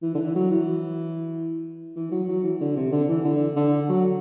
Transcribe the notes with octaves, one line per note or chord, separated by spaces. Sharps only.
E3
D3
E3
F#3
E3
E3
F#3
F#3
E3
D3
C3
D3
E3
D3
D3
F#3